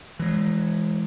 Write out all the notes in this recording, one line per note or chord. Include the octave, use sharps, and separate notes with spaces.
E3 G#3